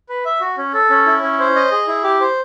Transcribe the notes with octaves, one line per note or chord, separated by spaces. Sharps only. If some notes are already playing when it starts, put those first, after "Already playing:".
B4
E5
F#4
C#4
A4
C#4
E4
C#4
C5
D#5
G#4
E4
G4
C5